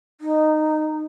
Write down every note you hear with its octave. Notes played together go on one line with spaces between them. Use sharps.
D#4